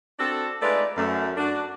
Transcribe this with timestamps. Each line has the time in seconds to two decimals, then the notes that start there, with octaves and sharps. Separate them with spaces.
0.19 C4 D4 F#4 A4
0.62 G#3 A3 D#4 F4 B4 D5
0.97 F#2 A3
1.37 D4 F#4